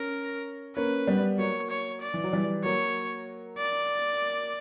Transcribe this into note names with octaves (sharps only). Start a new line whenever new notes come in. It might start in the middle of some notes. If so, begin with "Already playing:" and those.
Already playing: C#4 A#4
A#3 C#4 B4
G3 B3
F#3 A#3 C#5
C#5
D5
E3
F#3
E3 G3
F#3 A#3 C#5
D5